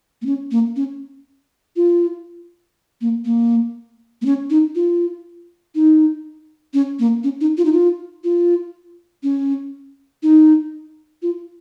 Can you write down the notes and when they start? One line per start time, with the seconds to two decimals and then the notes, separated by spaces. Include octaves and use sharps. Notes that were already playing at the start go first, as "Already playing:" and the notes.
0.22 A#3
0.26 C#4
0.51 A#3
0.76 C#4
1.76 F4
3.01 A#3
3.25 A#3
4.22 A#3
4.26 C#4
4.50 D#4
4.75 F4
5.75 D#4
6.74 C#4
6.99 A#3
7.24 C#4
7.41 D#4
7.58 F4
7.65 D#4
7.73 F4
8.24 F4
9.23 C#4
10.23 D#4
11.23 F4